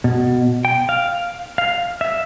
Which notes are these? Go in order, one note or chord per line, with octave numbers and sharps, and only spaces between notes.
B2
G5
F5
F5
E5